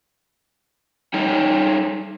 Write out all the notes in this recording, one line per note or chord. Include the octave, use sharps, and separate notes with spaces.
G3 D#4 C#5 G5